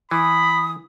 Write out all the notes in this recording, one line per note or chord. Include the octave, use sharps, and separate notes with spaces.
E3 B5 D#6